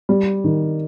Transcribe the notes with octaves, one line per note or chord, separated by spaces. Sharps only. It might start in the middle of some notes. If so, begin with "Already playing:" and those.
G3
D#3